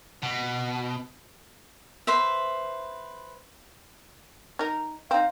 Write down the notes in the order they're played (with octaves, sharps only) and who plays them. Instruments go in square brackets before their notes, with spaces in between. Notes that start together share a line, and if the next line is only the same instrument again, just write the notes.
[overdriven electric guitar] B2
[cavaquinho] B4 C5 E5
[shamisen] D#4 A#4
[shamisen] C4 D#4 [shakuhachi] F5